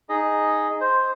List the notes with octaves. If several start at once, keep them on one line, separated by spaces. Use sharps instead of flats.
D#4 G#4 D#5
C5